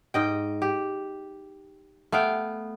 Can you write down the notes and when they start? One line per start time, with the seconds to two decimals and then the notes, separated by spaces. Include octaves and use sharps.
0.14 G#2 D#5 G5
0.62 G4
2.12 A3 B3 F5 G5